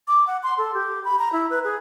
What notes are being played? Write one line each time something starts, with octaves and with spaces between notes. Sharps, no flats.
D6
F#5
C6
A4
G4
B5
A#5
E4
B4
G#4